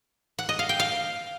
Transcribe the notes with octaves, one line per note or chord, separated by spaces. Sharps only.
F#5
D#5
F5
G5
F5